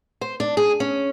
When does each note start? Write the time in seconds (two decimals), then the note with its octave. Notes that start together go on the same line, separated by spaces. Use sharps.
0.21 C5
0.40 D4
0.57 G#4
0.80 C#4